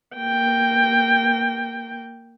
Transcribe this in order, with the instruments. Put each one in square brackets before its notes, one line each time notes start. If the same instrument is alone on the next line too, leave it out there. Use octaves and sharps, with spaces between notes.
[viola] A#3 G5